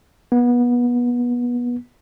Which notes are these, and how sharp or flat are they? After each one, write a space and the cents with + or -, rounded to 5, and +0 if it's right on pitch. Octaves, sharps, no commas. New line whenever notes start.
B3 -25